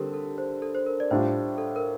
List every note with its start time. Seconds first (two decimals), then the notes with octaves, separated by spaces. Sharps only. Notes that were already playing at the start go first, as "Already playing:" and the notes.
Already playing: D3 G3 C4 G4 A4 A#4
0.14 A4
0.38 C5
0.62 A4
0.75 C5
0.86 A#4
1.00 D5
1.11 A2 G3 D4 F4 C5
1.58 A4
1.76 A#4